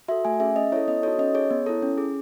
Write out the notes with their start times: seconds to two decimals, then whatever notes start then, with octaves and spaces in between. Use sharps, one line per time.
0.08 F#4 A4 E5
0.25 A3 G#5
0.40 C#4 G#4 E5
0.56 C#4 D#5
0.72 E4 A4 C#5
0.88 B3 D#5
1.03 D#4 F#4 A4 C#5
1.19 C#4 D#5
1.34 G#4 C#5
1.51 B3
1.66 E4 A4
1.82 C#4
1.98 G#4